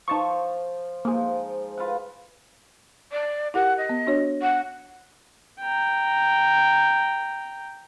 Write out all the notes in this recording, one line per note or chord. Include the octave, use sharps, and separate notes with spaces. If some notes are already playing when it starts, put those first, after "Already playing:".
F3 D#4 A5 C#6
G#2 F3 A#3 G#4
F4 B4 F#5
D5
E4 G4 A#4 F#5
D#5
B3
D4 F#4 C#5
F#5
G5 A#5